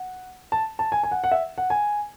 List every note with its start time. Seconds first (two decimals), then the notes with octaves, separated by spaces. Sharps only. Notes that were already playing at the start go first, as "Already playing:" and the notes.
Already playing: F#5
0.52 A5
0.79 A5
0.92 G#5
1.03 G#5
1.11 F#5
1.24 F#5
1.32 E5
1.58 F#5
1.70 G#5